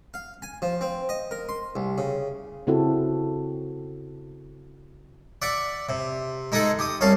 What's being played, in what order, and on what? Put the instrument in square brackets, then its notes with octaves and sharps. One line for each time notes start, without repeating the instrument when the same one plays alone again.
[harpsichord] F5
G#5
F3
C4
D#5
A#4
C6
C2
C#3
[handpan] C#3 C4 E4 F#4 A4
[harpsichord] D5 E5 F#5
C3
G#3 D#4 G#4 A4 F#5
G4 D#6
C2 C#4 F5 A5